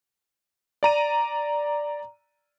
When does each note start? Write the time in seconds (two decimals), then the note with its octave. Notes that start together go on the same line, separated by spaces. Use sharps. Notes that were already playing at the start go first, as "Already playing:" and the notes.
0.83 D5 A#5 D#7